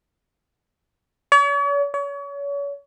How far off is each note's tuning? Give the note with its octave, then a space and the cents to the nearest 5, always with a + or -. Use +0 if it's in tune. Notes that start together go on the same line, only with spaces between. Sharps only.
C#5 +45
C#5 +35